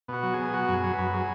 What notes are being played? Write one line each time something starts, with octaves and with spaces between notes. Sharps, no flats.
B2 F#4
F#3
B2 G#4
F#3 F#4
F#2
G#4
F#3
F#2 B4
F#3 G#4